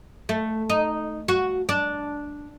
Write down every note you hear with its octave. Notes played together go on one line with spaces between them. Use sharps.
A3
D#4
F#4
D4